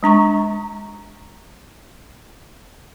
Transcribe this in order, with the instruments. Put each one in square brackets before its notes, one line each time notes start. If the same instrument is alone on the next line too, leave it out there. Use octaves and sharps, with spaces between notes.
[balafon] G#3 D4 A#5 C#6